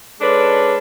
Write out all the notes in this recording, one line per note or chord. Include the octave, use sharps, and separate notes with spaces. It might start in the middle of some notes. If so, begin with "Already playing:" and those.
G#3 C#4 D4 A4 B4